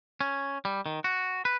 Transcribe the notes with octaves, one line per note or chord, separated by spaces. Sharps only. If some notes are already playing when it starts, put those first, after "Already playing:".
C#4
G3
D#3
F#4
B4